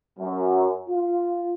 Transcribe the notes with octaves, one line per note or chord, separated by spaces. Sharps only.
F#2
F4